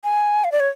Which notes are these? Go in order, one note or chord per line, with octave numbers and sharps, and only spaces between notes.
G#5
F5
D5
C#5